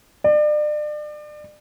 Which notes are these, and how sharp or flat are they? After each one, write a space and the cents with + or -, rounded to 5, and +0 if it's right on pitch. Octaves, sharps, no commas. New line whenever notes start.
D5 +35